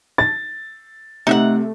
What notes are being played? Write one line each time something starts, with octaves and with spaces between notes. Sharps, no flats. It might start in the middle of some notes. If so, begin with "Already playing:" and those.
A6
C3 A3 D#4 E5 F#5